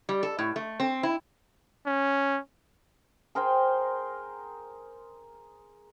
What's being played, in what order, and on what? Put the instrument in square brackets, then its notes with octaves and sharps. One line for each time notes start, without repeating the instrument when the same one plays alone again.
[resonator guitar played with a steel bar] G3
A4
A2
A3
C4
E4
[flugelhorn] C#4
[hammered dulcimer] G#4 A#4 C5 G5